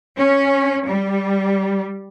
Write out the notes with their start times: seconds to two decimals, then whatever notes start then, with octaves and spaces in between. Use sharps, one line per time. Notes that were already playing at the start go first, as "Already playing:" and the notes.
0.17 C#4
0.86 G3